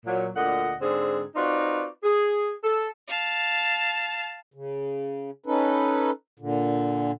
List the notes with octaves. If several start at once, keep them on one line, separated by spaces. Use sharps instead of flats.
A#2 F#3
D2 A#2 D3 D#5 F#5
G#2 D3 C4 G#4
C4 D#4 F4 F#4 B4 D5
G#4
A4
F5 A5
C#3
C#4 D#4 A4 B4
A#2 D3